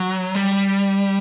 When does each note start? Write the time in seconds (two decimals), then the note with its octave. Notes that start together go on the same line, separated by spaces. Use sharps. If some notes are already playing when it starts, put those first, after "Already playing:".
Already playing: F#3
0.35 G3